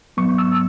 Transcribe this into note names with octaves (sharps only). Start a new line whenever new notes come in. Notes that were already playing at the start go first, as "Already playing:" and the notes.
G#2 F#3 B3 C#6
E6